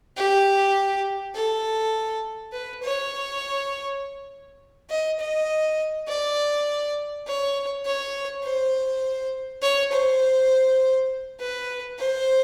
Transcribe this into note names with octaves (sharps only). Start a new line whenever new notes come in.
G4
A4
B4
C#5
D#5
D#5
D5
C#5
C#5
C5
C#5
C5
B4
C5